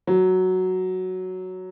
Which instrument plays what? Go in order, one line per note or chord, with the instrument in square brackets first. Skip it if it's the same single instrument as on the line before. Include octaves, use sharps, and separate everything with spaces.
[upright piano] F#3